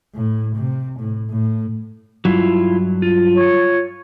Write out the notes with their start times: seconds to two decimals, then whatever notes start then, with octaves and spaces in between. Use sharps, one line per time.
0.15 A2
0.55 C3
0.99 A2
1.30 A2
2.25 G2 F#3 E4 F4
3.02 F4
3.36 C#5